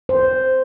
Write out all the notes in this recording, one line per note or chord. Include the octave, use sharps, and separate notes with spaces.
C5